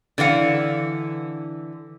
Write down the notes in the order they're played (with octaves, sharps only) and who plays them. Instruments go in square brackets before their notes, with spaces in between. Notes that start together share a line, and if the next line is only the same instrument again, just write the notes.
[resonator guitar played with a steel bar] D3 E3 F5 F#5